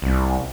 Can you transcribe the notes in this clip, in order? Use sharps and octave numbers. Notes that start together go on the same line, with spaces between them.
C2